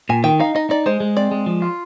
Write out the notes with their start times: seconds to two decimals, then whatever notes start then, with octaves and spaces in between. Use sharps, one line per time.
0.09 A#2 G#5
0.24 D#3 G5
0.40 D#4 F5
0.55 D#4 D#5
0.70 D#4 D5
0.86 G#3 C5
1.00 G#3
1.17 C4 D5
1.31 G#3
1.46 F3
1.62 F4